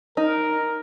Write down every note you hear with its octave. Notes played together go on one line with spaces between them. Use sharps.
D#4 A#4